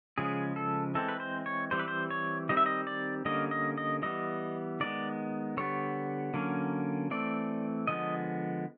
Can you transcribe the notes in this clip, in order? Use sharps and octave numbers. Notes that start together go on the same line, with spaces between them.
C#3 F3 G#3 C#4 G#4
A4
E3 G#3 C4 A4
B4
C5
C#5
E3 G3 C4 C5
B4
C5
C#5
D#3 G3 C4 D#5
E5
D#5
D5
D3 G3 A#3 C#4 D#5
D#5
D#5
E3 G3 B3 D#5
D#3 G#3 B3 D5
D3 G3 B3 C#5
D3 F#3 A#3 C#4
E3 A3 C4 D5
D3 F3 G#3 B3 D#5